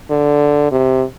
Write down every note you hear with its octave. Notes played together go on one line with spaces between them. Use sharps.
D3
C3